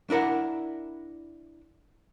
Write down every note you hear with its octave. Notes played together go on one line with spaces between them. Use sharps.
D4 E4 A#4 F#5